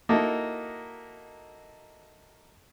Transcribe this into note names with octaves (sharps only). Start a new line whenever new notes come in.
A#3 D#4 E4 F#4 A4